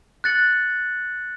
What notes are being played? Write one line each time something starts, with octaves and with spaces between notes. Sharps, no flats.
F#6 A6 C#7 F#7